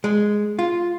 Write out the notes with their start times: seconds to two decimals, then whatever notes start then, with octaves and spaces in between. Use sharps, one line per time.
0.04 G#3
0.59 F4